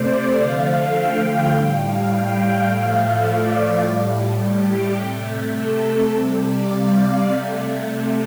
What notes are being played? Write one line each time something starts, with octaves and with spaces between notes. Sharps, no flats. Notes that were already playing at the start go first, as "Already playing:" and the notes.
Already playing: C3 A3 C5 D5
D3 F3 A3 F5
G5
A2 G3 G5
F5
G5
A2 F3 A3 F5
D5
A2 G3
G4
C3 A3
A4
C3 G3 C5
D5
F5
C3 A3